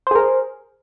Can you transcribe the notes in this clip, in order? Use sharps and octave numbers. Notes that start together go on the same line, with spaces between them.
G#4 A#4 C5